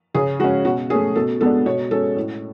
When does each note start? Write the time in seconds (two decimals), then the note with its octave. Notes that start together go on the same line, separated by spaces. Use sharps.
0.14 C#3 G#4
0.40 G#3 C#4 F#4
0.65 B2 F#4
0.90 C#4 G#4
0.94 A3
1.15 B2 A4
1.41 G#3 B3 D4 A4
1.66 B2 C#5
1.91 G#3 C#4 A4
2.16 A2